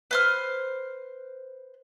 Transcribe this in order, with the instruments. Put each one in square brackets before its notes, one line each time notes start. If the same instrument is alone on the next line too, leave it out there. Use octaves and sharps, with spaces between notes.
[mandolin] B4 C5 F6